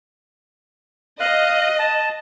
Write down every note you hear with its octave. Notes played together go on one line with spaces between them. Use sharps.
D#5 F5 F#6
A5